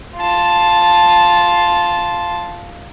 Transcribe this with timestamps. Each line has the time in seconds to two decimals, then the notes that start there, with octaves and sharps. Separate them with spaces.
0.17 F4 A5